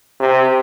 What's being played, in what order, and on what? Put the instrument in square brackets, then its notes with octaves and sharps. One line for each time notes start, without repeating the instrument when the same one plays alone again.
[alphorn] C3